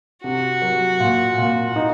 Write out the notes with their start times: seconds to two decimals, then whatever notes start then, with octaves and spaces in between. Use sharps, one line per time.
0.24 C3 F#4
0.62 F#3
1.00 A#2
1.38 A#2
1.76 D#4